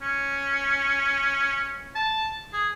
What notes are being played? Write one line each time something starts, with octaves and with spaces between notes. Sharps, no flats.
C#4
A5
G#4